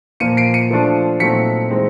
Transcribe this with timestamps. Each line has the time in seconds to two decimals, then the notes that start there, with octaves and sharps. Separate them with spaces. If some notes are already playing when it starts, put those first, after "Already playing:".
0.20 A#2 F3 A#3 C#7 D#7
0.37 C7 D7
0.54 C#7 D#7
0.71 F3 A3 D4 F4
1.20 A#2 F#3 A3 C4 D#4 B6 C#7
1.71 E3 G#3 C4 D#4